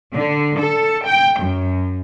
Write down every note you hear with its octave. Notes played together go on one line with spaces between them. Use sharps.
D3
A4
G5
F#2